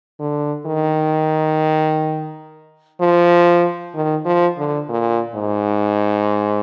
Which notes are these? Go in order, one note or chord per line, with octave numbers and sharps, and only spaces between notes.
D3
D#3
F3
D#3
F3
D3
A#2
G#2